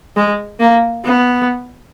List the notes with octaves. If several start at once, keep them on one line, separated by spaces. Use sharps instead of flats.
G#3
A#3
B3